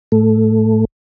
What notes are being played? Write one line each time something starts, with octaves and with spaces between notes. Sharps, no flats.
A2 A3